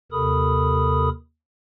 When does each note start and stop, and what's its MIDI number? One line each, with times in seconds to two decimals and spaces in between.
0.12 1.09 39
0.12 1.09 48
0.12 1.09 69
0.12 1.09 70
0.12 1.09 83
0.12 1.09 87